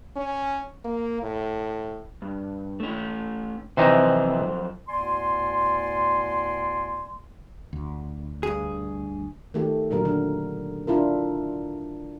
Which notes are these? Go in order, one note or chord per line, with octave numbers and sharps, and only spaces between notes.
C#4
A#3
A2
G2
A3 C#4
F#2 C3 E3 F3 D#4 C5
D2 A2 B3 D5 G#5 C6
D2
G2 G#4
D#3 A3 G4
A#2 D3 F#3 A#4
D3
D4 E4 F4 A#4